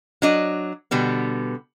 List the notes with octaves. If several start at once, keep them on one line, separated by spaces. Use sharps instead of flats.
F#3 D4 D#5
B2 D3 G3 B3